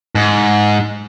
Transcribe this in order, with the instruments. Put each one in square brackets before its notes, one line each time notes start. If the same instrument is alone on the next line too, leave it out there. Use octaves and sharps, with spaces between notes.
[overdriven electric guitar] G#2